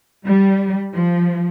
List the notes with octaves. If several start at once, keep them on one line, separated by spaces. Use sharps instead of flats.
G3
F3